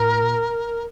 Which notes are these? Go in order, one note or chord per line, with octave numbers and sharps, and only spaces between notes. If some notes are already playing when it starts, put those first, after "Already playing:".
Already playing: A2 A#4
A#2